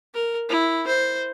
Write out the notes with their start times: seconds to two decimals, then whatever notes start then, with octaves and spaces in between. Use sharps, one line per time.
0.14 A#4
0.49 E4
0.87 C5